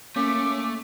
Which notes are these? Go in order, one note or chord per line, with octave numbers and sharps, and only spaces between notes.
A3 A#3 C#4 D6 B6